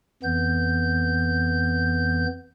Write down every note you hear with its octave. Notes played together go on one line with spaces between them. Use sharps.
F2 E3 B3 G6